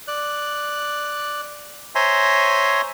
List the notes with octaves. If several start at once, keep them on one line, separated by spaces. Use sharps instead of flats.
D5 F#6
C5 C#5 E5 G#5 A#5 C6